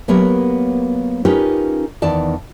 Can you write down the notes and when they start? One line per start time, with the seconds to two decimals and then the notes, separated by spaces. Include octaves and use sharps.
0.08 F#3 A#3 B3 G4 A#4 C#5
1.25 C#4 D#4 F4 G4 A#4 B4
2.02 E2 D#3 D5 A5